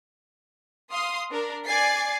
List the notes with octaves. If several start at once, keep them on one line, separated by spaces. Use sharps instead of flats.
F5 C6 D#6
D4 A#4
D5 G#5 A6 C7